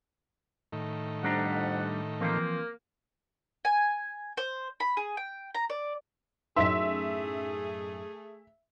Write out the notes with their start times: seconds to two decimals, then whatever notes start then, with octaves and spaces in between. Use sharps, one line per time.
0.73 A2 D#3
1.23 F2 G3 D4 F#5 A#5
2.21 E3 F3 A#3 C4
3.65 G#5
4.37 C5
4.80 B5
4.97 G#4
5.17 G5
5.55 A#5
5.70 D5
6.56 F#2 A2 A3 D#4 G#4 E5 C6 B6